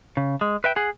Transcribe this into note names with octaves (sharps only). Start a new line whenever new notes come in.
C#3
G#3
B4 E5 G5
G#4 F#5